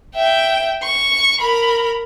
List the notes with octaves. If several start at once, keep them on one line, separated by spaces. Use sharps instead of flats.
E5 G5
C#6
A#4 B5